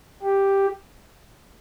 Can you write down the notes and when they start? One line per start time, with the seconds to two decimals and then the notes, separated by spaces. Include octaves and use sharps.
0.23 G4